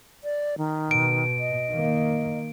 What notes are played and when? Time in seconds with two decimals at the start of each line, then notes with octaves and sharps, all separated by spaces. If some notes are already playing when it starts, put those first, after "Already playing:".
0.24 D5
0.58 D#3
0.91 B2 D7
1.39 D#5
1.71 D#3 A#3